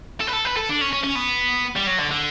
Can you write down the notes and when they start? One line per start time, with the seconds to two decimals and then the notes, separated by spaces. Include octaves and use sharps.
0.21 A4
0.28 B4
0.33 A4
0.45 B4
0.57 A4
0.69 D4
0.81 C#4
0.93 C#4
1.03 C#4
1.15 B3
1.76 G3
1.87 F#3
1.98 D3
2.11 D3